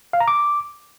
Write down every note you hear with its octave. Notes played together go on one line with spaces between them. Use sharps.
F5
A#5
D6